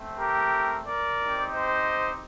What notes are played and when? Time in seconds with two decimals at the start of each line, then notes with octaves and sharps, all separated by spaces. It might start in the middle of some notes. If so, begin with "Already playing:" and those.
Already playing: A3 C4
0.20 G4 A#4
0.86 A#4 D5
1.20 C4 D#4 G4
1.53 C5 D#5